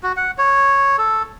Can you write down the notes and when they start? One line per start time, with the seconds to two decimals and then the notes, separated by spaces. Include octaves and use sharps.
0.03 F#4
0.17 F#5
0.38 C#5
0.98 A4